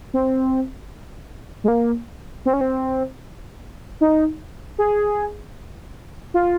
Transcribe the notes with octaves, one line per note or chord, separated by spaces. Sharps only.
C4
G#3
A#3
C4
C#4
C4
D#4
G#4
F4